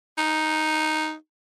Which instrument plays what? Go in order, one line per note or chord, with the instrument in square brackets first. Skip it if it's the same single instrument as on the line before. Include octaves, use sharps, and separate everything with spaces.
[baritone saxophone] D#4